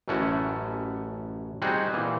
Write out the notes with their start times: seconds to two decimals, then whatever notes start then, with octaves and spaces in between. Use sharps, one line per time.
0.08 A1 F#2 A3 C#4 E4 F#4
1.62 G3 C4 D#4 F#4 G#4
1.93 A#2 E3